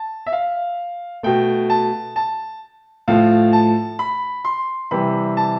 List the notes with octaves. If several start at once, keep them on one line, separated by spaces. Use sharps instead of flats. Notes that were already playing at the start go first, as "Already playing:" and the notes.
Already playing: A5
E5
F5
B2 A3 G5
A5
A5
A2 F3 A3 F5
A5
B5
C6
C3 E3 G3 B5
A5